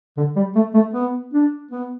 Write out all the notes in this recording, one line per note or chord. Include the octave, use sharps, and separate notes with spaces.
D3
G3
A3
A3
B3
D4
B3